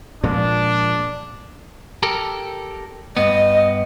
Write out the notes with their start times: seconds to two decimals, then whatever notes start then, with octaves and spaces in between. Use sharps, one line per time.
0.24 A#2 F3 G#3 D4
2.03 G4 A4 A#4
3.17 G2 B3 D#5